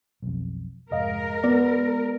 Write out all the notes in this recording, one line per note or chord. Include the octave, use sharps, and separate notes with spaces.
B1 F2
F1 G#2 G#3 A#4 D#5 F5
B3 D5